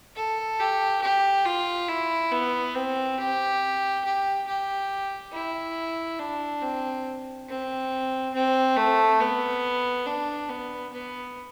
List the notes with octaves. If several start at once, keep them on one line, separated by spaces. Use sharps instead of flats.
A4
G4
G4
F4
E4
B3
C4
G4
G4
G4
E4
D4
C4
C4
C4
A3
B3
D4
B3
B3